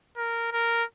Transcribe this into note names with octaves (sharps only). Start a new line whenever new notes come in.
A#4
A#4